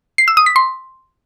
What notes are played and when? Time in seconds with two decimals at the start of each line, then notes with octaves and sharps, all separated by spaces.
0.18 C7
0.28 E6
0.37 D#6
0.46 B6
0.56 C6